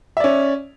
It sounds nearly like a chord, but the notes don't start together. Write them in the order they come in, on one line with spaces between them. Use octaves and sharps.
E5 D5 C#4